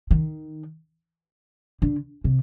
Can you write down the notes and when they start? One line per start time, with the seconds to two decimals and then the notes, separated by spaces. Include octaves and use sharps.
0.11 D#3
1.82 D3
2.24 C3